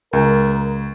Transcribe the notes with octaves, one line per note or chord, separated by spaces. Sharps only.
C#2 A#4